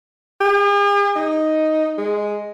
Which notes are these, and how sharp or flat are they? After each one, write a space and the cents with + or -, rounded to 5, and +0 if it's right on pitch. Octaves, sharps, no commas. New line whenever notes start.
G#4 -45
D#4 +5
G#3 +0